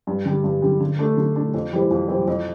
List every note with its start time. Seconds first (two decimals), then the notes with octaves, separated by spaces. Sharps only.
0.07 G2
0.25 D3 G3
0.44 G2
0.62 D3 G3
0.81 D3
0.99 A3 D4
1.17 D3
1.36 A3 D4
1.54 F2
1.72 E3 G3 C4
1.91 F2
2.09 E3 G3 C4
2.27 F2